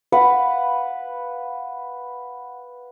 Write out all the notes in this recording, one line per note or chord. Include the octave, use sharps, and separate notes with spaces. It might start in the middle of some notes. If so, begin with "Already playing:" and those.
B4 F5 F#5